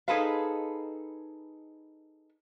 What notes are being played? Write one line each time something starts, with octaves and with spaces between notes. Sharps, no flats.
D#4 G#4 A4 B4 C5 F5